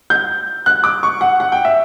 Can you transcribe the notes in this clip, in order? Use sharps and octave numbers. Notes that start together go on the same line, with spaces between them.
G6
F#6
D6
C#6
F#5
F#5
G5
E5